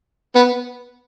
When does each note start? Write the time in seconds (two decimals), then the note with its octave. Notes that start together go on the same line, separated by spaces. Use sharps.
0.35 B3